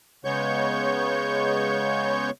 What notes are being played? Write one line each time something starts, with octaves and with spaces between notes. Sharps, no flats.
C#3 G#3 B3 C#5 C#6 G6